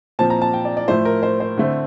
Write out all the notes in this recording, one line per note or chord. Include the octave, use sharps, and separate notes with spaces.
A#2 F3 C4 A5
A#5
A5
G5
D5
D5
A2 F3 A3 C5
A#4
C5
C5
D3 A3 C4